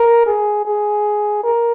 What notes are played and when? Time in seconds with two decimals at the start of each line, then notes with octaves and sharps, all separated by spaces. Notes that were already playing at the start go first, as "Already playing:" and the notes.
Already playing: A#4
0.26 G#4
0.65 G#4
1.44 A#4